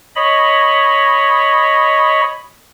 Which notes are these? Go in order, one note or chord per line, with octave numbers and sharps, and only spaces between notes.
C#5 D#5 B5